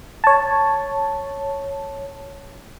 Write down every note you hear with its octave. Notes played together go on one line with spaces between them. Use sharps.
C#5 A5